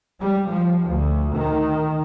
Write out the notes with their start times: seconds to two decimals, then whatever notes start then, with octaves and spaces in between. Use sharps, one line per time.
0.19 G3
0.49 F3
0.87 D2
1.35 D#3